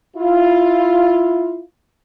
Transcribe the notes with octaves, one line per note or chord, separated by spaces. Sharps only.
E4 F4